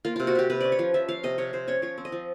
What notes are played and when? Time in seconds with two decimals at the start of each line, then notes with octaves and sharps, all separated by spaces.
0.05 A#3 F4
0.16 C3 F4
0.27 F#4
0.35 C3 G4
0.50 C3 B4
0.61 C#4 D5
0.72 C#5
0.79 F3
0.94 F3 E5
1.08 F3 F5
1.23 C3 D#5
1.38 C3 C#5
1.53 C3 C5
1.67 C#4 C#5
1.82 F3 C#5
1.98 C4
2.05 D#5
2.12 F3